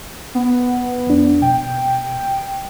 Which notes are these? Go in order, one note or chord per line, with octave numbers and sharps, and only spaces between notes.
B3
F2 D4
B2 G5